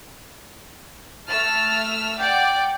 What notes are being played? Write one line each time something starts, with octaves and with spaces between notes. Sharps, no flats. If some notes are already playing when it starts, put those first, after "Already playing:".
A3 A5 E6 F6
D5 F#5 G5